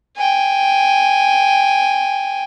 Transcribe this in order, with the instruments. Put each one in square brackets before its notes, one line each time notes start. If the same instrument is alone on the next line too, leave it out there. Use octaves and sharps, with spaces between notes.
[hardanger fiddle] G5 G#5